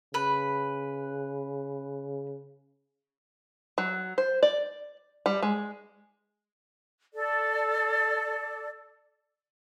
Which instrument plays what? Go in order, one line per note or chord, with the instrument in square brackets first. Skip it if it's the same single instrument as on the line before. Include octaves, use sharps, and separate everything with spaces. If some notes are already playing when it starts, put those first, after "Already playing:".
[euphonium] C#3 [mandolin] B4
[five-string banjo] F#3
C5
D5
G3
G#3
[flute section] A4 D5